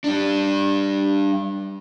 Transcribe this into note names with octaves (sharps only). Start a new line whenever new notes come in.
G3 D4